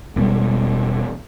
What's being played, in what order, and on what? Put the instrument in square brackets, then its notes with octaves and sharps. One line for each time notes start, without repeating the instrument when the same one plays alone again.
[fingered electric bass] E1 B2 G3